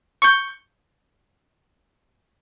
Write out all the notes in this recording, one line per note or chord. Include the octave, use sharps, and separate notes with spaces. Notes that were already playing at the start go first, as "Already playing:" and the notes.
C#6 G6